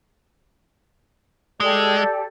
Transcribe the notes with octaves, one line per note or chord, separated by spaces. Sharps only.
G#3 G4 A4 D5